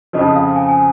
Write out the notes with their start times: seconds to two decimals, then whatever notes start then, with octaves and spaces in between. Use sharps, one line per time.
0.13 F2 C#3 F3 D#5
0.36 F5
0.56 G#5
0.69 G#5